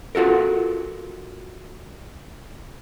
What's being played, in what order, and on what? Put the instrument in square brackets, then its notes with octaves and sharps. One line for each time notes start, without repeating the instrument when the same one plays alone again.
[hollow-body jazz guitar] F4 F#4 A4 A#4